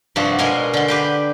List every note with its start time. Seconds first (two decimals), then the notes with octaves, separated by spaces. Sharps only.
0.16 G2 C3 F3 F#4 A5
0.39 B2 G#3 A#4 G#5 C6
0.74 D3 C6
0.88 G4 B4 G5